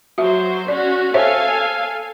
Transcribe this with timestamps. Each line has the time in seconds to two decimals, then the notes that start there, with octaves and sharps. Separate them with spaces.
0.18 F#3 F#4 C5 E5
0.68 C#4 F#4 D5
1.14 A4 C5 C#5 E5 F5 G#5